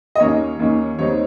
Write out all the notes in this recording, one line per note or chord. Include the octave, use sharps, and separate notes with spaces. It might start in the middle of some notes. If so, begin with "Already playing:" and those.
D#5
D#2 D#3 A#3 C#4 C#5
D#2 D#3 A#3 C#4
D#2 D#3 G3 C4 D#4 C#5